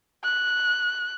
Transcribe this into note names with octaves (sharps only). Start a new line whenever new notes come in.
F#6